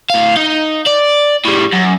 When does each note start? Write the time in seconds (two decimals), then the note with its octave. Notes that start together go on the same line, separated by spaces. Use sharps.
0.10 A2 F5
0.37 D#4
0.86 D5
1.45 A2 G3
1.73 F#2